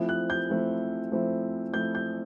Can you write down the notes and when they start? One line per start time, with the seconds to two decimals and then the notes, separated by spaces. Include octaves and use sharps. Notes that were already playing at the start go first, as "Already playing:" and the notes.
Already playing: F3 A3 C4 E4
0.09 F#6
0.30 G6
0.50 F3 A3 C4 E4
1.12 F3 A3 C4 E4
1.73 F3 A3 C4 E4 G6
1.95 G6